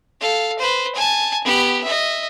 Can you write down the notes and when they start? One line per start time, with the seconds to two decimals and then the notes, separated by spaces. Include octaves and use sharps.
0.20 A4 F5
0.59 B4 C5
0.95 G#5 A5
1.44 B3 G4
1.83 D#5 E5